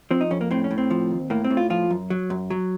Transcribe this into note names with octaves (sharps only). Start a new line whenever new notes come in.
F3 C4
D#4
F2 C#4
A#3
A2 C4
C#4
A2
C4
F3
D#2
A2 A#3
C4
A2
F4
F3 F4
F#2
F#3
F#2
F#3